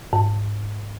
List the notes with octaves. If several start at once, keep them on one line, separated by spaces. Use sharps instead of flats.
G#2